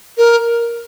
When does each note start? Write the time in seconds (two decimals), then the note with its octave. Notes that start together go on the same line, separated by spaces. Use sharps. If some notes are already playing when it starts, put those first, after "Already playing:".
0.18 A#4